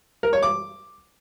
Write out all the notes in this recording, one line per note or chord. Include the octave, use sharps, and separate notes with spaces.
A#4
C#5
D6